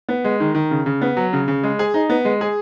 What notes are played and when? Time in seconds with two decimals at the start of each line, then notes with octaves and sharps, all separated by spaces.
0.09 B3
0.24 G#3
0.40 D#3
0.55 D#3
0.71 C#3
0.86 C#3
1.01 B3
1.17 F#3
1.33 C#3
1.48 C#3
1.63 G#3
1.79 G#4
1.94 D#4
2.09 B3
2.25 G#3
2.41 G#4